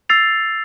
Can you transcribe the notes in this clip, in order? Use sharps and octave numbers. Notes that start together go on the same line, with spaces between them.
E6 A6 C7 F7